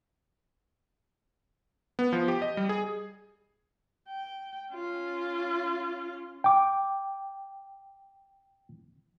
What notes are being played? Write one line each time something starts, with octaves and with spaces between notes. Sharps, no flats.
B3
F3
G4
D#5
G3
G#4
G5
C#4 F4
G5 D6